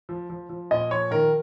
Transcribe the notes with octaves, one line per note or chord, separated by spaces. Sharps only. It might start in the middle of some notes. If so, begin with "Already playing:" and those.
F3
F3
F3
A#2 D#5
F3 C#5
D#3 A#4